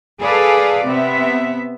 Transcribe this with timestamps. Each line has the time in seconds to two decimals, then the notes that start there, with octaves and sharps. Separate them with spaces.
0.20 G#4 A4 B4 D5 F5
0.84 C3 B3 E5